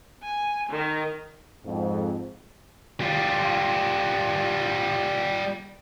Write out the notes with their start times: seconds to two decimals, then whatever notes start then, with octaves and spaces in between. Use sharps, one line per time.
0.23 G#5
0.70 D#3
1.66 F2 G#2
3.01 G3 F4